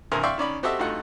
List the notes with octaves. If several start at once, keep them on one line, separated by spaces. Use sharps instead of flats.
C2 G2 E3 A#4 C5 G#5
D5 E5 F5 G5 C6 C#6
D#3 C#4 D5 B5
C4 F#4 G4 A4 D#5 E5
G2 A3 D#4 F4 F#4 F#5